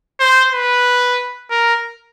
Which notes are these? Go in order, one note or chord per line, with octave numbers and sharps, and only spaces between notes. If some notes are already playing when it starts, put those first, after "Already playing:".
C5
B4
A#4